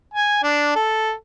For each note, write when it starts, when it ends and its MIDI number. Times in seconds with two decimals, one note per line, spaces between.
0.14 0.42 80
0.43 0.71 62
0.76 1.12 69